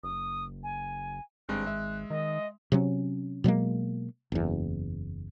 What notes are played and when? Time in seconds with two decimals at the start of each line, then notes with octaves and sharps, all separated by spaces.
0.04 F#1 D#6
0.63 G#5
1.49 G#1 G2 G#3 C4 F#6
1.66 G#3 E5
2.10 D#3 D#5
2.72 C3 F#3 C#4
3.44 B2 F#3 G#3 A#3
4.32 F#1 E2